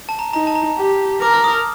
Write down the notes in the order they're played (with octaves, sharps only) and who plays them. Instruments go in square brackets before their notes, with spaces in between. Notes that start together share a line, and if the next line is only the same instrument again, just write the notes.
[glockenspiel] A5
A#5
[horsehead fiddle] D#4 [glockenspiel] A#5
[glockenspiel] A5
A#5
[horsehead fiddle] G4
[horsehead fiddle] A#4 [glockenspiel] D6
[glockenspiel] F6
D#6